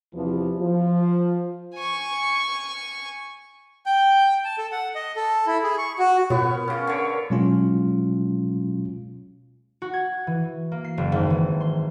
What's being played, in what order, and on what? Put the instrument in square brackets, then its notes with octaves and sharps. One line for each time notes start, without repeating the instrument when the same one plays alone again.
[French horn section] E2 C3 E3 F3
F3
[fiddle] G#5 C#6
[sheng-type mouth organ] G5
A5
A4
F#5
D#5
A4
E4
G#4
C#6
F#4
[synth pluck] B2 F4 [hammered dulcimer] B3 [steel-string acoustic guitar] C#5
[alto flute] A#4
[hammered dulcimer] C#3 C#4 [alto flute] A#4
[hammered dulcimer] D3 C#5
[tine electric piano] B2 F#3 G#3 C#4 F4
[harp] F#4
G#6
E3
A#3
C7
F#1
G#1
E3
C6